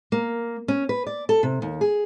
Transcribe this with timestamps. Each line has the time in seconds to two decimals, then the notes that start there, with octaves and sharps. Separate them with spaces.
0.12 A#3
0.68 C#4
0.89 B4
1.07 D5
1.29 A4
1.43 C3
1.62 D#2
1.81 G#4